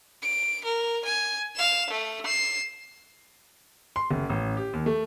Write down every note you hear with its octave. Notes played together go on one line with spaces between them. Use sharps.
D7
A#4
G#5
F5 E7
A3
C7 E7
C6
F#1
A1
G4
D#2
A3